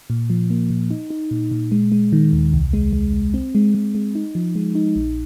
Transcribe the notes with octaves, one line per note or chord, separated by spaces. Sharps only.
A#2
F3
A#3
A#2
D#4
D#4
A#2
A#2
G#3
G#3
D#3
D#2
C2
G#3
G#3
C2
C4
G#3
G#3
G#3
D#4
F3
G#3
D#4
A#1